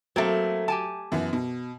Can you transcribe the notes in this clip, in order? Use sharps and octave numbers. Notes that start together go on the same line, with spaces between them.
F#3 A3 A#3 C4
G4 G#5 A5
F#2 E3 B3
B2